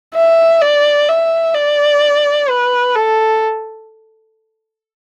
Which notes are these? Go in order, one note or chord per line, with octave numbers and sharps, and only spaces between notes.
E5
D5
E5
D5
B4
A4